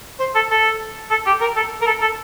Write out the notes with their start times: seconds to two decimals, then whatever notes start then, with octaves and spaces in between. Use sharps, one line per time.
0.19 C5
0.35 A4
0.50 A4
1.10 A4
1.26 G4
1.40 A#4
1.56 A4
1.81 A#4
1.87 A4
2.01 A4